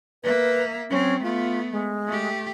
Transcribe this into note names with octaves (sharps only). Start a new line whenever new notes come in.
A#3 B4 E5
F#3 C4 C#4
A3 B3 F4
G#3
A3 G4